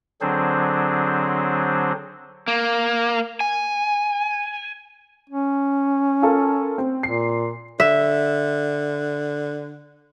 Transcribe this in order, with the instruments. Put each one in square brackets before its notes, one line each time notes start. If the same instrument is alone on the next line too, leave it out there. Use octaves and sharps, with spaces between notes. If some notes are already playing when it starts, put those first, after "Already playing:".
[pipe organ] D3 F#3 C4 D4 G#4 C5
[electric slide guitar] A#3
G#5
[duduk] C#4
[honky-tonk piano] F4 A4 A#4
C4
[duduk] A#2 [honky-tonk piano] C7
[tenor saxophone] D3 [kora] E5